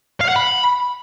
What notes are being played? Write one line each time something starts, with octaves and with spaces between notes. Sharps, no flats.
F5
F#5
B5